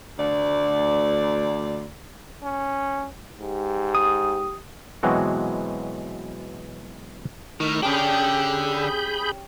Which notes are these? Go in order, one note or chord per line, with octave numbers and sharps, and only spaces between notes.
D2 D5
C#4
G#2 G4
D#6
B2 E3 F#3 G#3 C4 F#4
A2 D#3 D#4 F6
D3 C#4 D4 G4 G#4 B5 G6